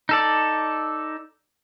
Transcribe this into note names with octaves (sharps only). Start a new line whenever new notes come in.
D#4 A4 D5